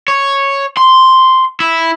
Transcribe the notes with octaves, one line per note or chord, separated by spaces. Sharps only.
C#5
C6
E4